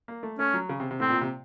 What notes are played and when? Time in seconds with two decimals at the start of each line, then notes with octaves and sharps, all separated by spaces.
0.08 A#3
0.23 A3
0.39 A3 C#4
0.54 F#3
0.69 C#3
0.80 C3
0.91 C3
1.00 A2 C4
1.10 A#2
1.21 C3